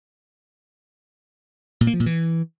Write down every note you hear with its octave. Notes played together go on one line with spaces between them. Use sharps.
A#2
A#3
F3
A#2
E3